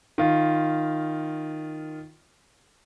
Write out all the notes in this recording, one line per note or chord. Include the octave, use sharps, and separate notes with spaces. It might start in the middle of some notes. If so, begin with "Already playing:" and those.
D#3 F4